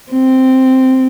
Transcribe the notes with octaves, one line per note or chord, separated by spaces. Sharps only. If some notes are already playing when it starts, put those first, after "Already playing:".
C4